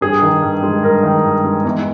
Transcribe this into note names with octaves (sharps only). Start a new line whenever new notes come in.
G2 G#4
D#3
G2
G#3
G2 A#4
D#3
G2
G#3
E2